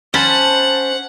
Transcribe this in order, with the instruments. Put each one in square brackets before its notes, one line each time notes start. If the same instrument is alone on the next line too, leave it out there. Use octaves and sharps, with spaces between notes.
[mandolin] C#4 A5 B5 [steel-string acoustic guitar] C5 [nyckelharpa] F#5